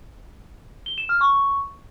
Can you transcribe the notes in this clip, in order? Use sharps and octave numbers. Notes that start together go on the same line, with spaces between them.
G7
E7
F6
C#6